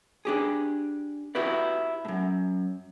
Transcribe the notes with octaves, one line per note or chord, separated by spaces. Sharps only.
D4 G4 G#4
E4 F#4 G4 B4 D5
F#2 A2